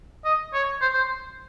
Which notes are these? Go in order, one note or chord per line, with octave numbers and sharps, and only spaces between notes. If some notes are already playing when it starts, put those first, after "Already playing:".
D#5
C#5
C5
C5